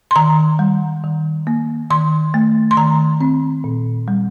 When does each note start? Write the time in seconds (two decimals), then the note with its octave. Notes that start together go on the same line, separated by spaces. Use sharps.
0.11 C6
0.16 D#3 A#5
0.59 G3
1.04 D#3
1.47 A#3
1.90 D#3 C6
2.34 A3
2.71 C6
2.77 D#3 A#5
3.21 C4
3.64 A#2
4.08 G3